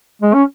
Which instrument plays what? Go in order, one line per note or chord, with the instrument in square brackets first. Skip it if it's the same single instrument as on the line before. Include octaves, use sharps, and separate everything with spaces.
[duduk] G#3
C#4